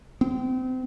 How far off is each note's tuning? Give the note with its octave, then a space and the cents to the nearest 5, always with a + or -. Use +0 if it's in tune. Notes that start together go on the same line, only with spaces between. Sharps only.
C4 -35